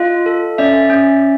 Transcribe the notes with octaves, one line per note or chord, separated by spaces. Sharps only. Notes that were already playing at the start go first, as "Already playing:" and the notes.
Already playing: F4 D#5 F5
A4
C#4 D5 E5
C#4